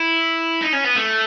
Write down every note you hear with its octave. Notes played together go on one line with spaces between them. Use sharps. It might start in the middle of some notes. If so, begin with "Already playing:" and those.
Already playing: E4
D#4
C#4
B3
A3